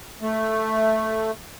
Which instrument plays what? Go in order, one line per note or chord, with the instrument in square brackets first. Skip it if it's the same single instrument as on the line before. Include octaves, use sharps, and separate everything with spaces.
[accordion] A3